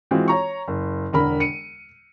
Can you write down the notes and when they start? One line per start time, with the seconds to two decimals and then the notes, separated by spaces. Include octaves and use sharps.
0.11 E3 G#3 C4 F4 F#4
0.28 C#5 A#5 C#6
0.68 F#1
1.13 E1 D3 A#4 B5
1.40 C#7 D#7